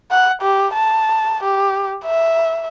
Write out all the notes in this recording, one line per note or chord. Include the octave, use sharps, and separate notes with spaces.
F#5
G4
A5
G4
E5